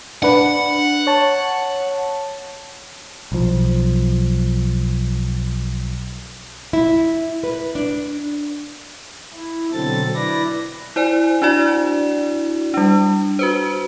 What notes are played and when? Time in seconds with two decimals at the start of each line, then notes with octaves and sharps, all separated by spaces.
0.23 D4 B4 F#5
1.07 C#5 A5
3.32 B1 F3
6.73 E4
7.43 B4
7.75 D4
9.33 E4
9.73 B2 D3 F#3 C4 A4 A6
10.15 E4 B4 D5 A#6
10.96 E4 C5 D5 G#5
11.42 D4 E4 F#4 D5
12.74 G3 D4
13.39 F#4 B4 C5